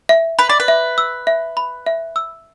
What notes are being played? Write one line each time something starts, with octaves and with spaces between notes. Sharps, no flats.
E5
B4 B5
D5
B4
E5
E6
E5
B5
E5
E6